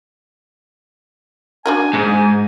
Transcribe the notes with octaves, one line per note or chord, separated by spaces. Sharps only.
D4 F#4 A#4 G#5
G#2